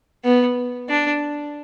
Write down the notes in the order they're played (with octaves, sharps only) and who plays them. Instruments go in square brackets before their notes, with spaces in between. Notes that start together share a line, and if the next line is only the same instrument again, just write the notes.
[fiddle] B3
D4